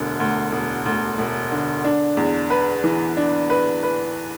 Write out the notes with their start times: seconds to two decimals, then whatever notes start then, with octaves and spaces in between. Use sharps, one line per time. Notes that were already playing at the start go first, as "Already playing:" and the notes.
Already playing: E1 D2 D3
0.20 D2
0.52 E1
0.86 D2
1.18 E1
1.51 D3
1.84 D4
2.17 E2
2.50 B4
2.84 E3
3.17 D4
3.50 B4
3.83 B4